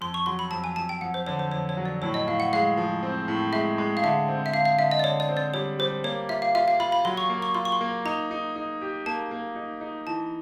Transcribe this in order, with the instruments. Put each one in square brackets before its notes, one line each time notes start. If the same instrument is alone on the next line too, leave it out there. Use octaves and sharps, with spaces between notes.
[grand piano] F2 [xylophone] C6
[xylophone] C#6
[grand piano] F#3 [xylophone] C6
[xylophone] B5
[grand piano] F2 [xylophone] A5
[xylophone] G#5
[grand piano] F2 [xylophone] A5
[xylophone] G5
[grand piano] F2 [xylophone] F#5
[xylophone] C5
[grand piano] D3 [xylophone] C#5
[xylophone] C5
[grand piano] F2 [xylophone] C#5
[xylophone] C#5
[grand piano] F#3
[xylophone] D5
[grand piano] A2 [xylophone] C#5
[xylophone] D#5
[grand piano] A2 [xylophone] F5
[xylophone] F#5
[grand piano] G#3 [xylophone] F5
[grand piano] F3
C4
A2
[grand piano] G#3 [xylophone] E5
[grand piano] G#3
[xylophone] F5
[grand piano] D3 [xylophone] E5
[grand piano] C4
[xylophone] E5
[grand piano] D3 [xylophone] F5
[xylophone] F5
[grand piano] D3 [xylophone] E5
[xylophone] D#5
D5
[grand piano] D3 [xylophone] C#5
[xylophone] D5
[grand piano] C4
[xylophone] D5
[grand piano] G3 [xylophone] C#5
[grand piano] G3 [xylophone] C5
[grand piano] A#3 [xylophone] C#5
[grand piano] F4 [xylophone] E5
[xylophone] F5
[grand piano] F4 [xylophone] E5
[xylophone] F5
[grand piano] F4 [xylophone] B5
[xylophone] B5
[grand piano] F#3 [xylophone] C6
[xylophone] C#6
[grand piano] A#3
[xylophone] C#6
[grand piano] F4 [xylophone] C6
[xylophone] C#6
C6
[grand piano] A#3
[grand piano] D#4 [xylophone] A#5
[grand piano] D#4
D#4
G4
[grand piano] A#3 [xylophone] A5
[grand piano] A#3
D#4
D#4
[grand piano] E3 [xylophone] A5